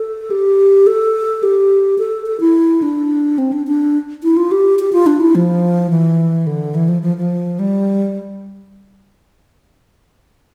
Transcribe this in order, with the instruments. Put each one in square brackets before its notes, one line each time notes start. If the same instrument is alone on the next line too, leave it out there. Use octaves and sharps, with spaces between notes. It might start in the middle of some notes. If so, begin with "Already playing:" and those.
Already playing: [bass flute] A4
G4
A4
G4
A4
A4
E4
D4
C4
D4
D4
E4
F4
G4
G4
F4
D4
E4
F3
E3
D3
E3
F3
F3
F3
G3